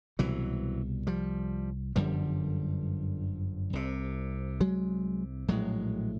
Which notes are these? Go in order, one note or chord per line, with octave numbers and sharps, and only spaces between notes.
C2 B2 E3 F#3
F3 G3
G1 F#2 D3 F3 G3
C2 C3
F#3 G#3
A#1 A2 F#3 G#3